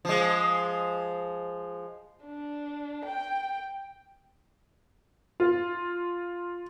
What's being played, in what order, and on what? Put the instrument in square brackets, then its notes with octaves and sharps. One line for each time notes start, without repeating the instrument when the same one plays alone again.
[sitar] F3 G#3
[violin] D4
G5
[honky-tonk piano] F4